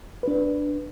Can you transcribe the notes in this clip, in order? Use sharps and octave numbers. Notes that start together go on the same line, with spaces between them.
D4 B4